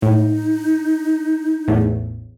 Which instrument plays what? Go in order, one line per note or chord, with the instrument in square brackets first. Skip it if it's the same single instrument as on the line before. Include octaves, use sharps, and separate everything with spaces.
[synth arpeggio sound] A2 [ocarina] D#4
[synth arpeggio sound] A1 E2 A2